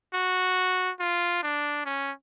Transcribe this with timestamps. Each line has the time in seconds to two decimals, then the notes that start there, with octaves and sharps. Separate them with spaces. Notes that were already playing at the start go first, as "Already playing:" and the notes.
0.14 F#4
1.00 F4
1.43 D4
1.86 C#4